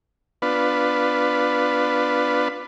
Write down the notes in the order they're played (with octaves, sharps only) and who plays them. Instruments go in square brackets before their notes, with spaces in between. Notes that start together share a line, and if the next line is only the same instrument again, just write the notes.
[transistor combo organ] B3 D4 F4 B4